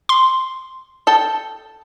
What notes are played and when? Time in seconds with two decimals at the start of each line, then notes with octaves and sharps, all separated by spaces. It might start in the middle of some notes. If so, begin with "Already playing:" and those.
0.09 C6
1.07 A4 G5 A5